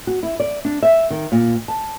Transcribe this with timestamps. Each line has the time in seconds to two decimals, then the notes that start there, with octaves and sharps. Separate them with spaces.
0.07 F#4
0.23 E4
0.40 D5
0.65 D4
0.83 E5
1.10 D#3
1.32 A#2
1.68 A5